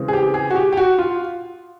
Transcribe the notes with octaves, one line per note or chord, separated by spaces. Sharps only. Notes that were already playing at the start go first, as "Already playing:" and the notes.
Already playing: C#3 E3 G#3 C4
G#4
G4
G#4
F#4
G4
G4
F#4
F4